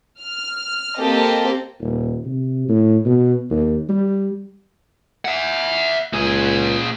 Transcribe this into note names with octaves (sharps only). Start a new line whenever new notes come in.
F6
A#3 C4 G4 A4 D#5
D#1
C3
A2
B2
D#2
G3
E5 F#5
C#2 A#2 G#4